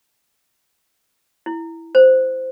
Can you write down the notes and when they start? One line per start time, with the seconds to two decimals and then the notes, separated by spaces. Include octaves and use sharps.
1.46 E4
1.95 C5